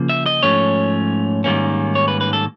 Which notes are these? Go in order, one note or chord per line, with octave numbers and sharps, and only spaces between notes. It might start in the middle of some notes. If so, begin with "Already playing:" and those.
Already playing: C#3 F3 A#3
E5
D#5
G#2 F3 A3 C#4 C#5
G#2 D#3 G3 A#3 C#4
C#5
B4
B4
A4